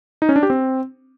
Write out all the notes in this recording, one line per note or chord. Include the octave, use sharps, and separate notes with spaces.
D#4
C#4
D4
G4
C4